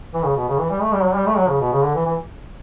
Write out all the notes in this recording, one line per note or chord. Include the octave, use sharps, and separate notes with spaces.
E3
C#3
B2
C#3
E3
G3
A3
G3
F#3
G3
A3
F#3
C#3
B2
C#3
D3
E3
E3